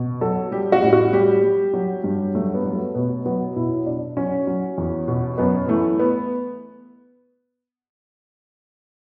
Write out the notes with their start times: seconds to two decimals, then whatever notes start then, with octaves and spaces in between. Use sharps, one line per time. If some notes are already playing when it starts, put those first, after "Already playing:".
Already playing: B2
0.21 F#3 A4
0.51 G3 G4
0.72 F#4
0.83 A2
0.93 F#4
1.13 G3 G4
1.44 G3
1.74 F#3
2.04 G2
2.35 F#3 A3
2.54 B3
2.64 F#3
2.75 A3
2.95 B2 B3
3.26 F#3 B3
3.56 B2 E4
3.86 B2 D4
4.17 F#3 C#4
4.47 F#3
4.78 E2
5.08 B2
5.38 F#2 B3
5.68 E3 A3
5.99 B3